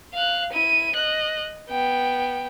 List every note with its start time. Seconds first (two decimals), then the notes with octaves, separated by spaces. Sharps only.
0.14 F5 F#6
0.53 E4 D#7
0.95 D#5 F#6
1.69 B3 G5